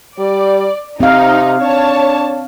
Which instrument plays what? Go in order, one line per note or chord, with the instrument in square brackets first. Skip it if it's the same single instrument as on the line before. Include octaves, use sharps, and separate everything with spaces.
[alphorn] G3 [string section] D5
[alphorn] C3 [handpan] C4 F5 [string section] D#4
[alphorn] D4 [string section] C#5 A5